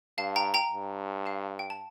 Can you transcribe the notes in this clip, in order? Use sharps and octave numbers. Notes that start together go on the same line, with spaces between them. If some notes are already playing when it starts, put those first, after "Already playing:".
G2 F5 A5
G5 A#5
G5 A#5
G2
F5 A5
G5
A5